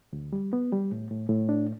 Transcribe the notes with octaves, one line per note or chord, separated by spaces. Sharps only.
D2
G3
B3
G3
A2
A2
A2
D4